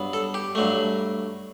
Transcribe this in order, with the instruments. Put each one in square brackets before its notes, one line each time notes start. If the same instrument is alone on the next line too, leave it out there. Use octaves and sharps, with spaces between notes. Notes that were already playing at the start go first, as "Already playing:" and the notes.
Already playing: [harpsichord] G2 F#3 B3
A4
G4
G2 F#3 A3